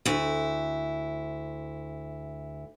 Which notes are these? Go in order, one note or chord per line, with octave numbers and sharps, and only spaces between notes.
D2 E4